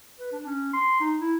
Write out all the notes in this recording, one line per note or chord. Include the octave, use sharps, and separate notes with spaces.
B4
D4
C#4
C6
D#4
E4